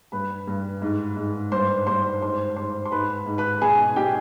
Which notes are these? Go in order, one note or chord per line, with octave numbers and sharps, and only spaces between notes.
G2 B4 B5
G2
G#2
G#2
G2 C5 C6
G2 C5 C6
G#2 C5 C6
G#2 C5 C6
C6
G#2 B4 B5
G#2
B4 B5
B2 G#4 G#5
B2 G4 G5